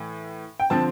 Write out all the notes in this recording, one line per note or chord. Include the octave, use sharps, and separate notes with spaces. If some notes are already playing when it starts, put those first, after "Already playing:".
Already playing: A2 E3
G5
D3 F3 C4 A5